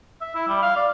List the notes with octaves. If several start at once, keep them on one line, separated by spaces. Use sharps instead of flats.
E5
E4
G3
F5
D5